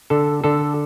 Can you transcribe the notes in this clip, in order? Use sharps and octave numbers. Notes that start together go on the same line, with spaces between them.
D3 A4
D3 A4